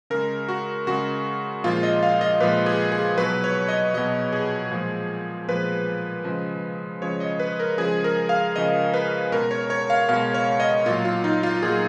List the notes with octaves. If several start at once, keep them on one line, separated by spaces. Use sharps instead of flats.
C#3 G#3 A#4
F#4
C#3 G#3 F#4
A#2 F3 G#3 F4
D#5
F5
D#5
A#2 F3 G#3 B4
G#4
G#4
B2 F#3 B4
C#5
D#5
B2 F#3 D#5
G#4
A#2 F3 G#3
A#2 F3 G#3 B4
C#3 F3 G#3
C#3 F3 G#3 C#5
D#5
B4
A#4
C#3 F3 G#3 G#4
A#4
F5
C#3 F3 G#3 D#5
B4
B2 G#3 A#4
C#5
C#5
F5
B2 G#3 F5
C#5
D#5
A#2 F#3 F4
F4
D#4
F4
A#2 F#3 G#4